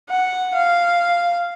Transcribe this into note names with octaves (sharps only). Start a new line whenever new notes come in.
F#5
F5